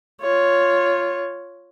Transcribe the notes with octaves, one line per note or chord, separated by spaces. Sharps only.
F4 C#5